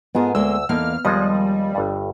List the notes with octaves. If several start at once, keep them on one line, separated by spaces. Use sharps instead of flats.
G#2 B3 F4 G#4 A#4 A5
D2 G#3 A#3 E6
E2 A#3 D#4 A4 D#5 F5 F6
D#2 F3 G3 G#3 D#5
G1 G2